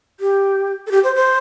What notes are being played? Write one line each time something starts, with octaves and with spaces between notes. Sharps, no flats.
G4
A4
G4
C5
C5